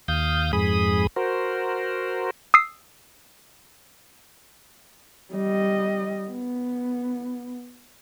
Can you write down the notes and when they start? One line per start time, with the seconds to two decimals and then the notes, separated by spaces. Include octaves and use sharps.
0.08 D#2 F5 D#6 G6
0.53 F2 G#2 G#4 B5 D#6
1.16 F#4 A#4 C5
2.54 D#6 E6 C7
5.34 G3 D#5
6.30 B3